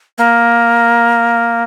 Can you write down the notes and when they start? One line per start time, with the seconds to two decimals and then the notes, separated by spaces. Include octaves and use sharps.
0.18 A#3